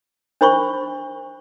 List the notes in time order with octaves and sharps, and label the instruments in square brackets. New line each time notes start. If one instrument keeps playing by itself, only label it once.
[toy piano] D4 C5 B5 C#6